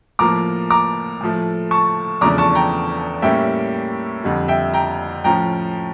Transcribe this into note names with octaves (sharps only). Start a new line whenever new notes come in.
A2 F3 A#3 A#5 D6
A#5 D6
A2 F3 A3
A5 C#6
E2 C#3 F3 A3 D4 A#5 D6
A5 C#6
G5 A#5
A2 G3 A#3 C#4 E5 G5
F2 D3 G3
E5 G5
G5 A#5
A2 F3 C#4 G5 A#5